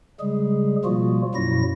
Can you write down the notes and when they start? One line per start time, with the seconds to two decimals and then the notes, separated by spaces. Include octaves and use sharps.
0.20 C#3 G3 G#3 G#4
0.85 B2 F3 G3 A#3 F4 F#4
1.35 F#2 B2 F#3 E4 A#6